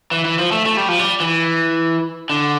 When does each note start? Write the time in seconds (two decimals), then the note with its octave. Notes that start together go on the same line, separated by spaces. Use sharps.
0.11 E3
0.25 E3
0.39 F3
0.52 A3
0.66 A3
0.77 G3
0.88 F3
0.99 G3
1.20 E3
2.30 D3